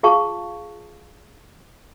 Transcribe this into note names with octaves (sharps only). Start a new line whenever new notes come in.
F4 G#4 F5 A5 C#6